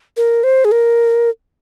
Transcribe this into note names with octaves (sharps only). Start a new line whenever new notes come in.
A#4
C5
G#4
A#4